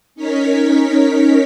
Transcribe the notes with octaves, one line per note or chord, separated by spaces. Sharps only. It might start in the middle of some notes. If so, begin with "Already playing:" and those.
C#4 D#4 A#4 C#5 B6